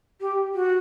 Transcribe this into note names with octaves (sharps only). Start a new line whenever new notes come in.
G4
F#4